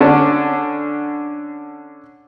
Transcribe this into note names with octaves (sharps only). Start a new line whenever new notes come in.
D3 C#4 D4